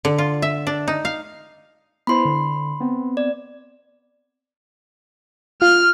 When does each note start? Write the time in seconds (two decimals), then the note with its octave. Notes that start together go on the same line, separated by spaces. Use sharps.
0.05 D3
0.18 F4
0.42 E5
0.67 D4
0.88 D#4
1.05 F5
2.07 B3 E4 C5 B5 C6
2.25 D3
2.80 B3 C4
3.17 D5
5.62 F4 F6